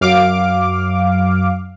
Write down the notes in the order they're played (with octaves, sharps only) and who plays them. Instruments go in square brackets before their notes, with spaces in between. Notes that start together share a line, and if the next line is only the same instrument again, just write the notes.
[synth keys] F#2 F5 D6